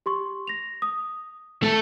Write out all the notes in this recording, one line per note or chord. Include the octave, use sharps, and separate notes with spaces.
G4 C6 C#6
A#6 F7
D#6
A3 A4